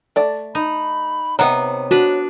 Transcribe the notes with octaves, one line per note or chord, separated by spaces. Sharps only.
A3 D5
D#4 B5
C3 B3 D#4 C#5 F#5
D4 F#4 B4